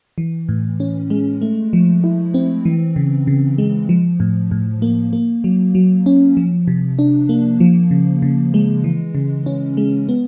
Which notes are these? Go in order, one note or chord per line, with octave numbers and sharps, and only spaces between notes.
E3
A2
C#4
G#3
A3
F3
E4
C4
E3
C#3
C#3
G#3
F3
A2
A2
A#3
A#3
F#3
F#3
C#4
F3
C3
D4
A#3
F3
C#3
C#3
G#3
E3
C#3
C#4
G#3
B3